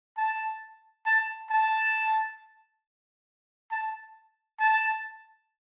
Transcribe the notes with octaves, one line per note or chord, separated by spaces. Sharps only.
A5
A5
A5
A5
A5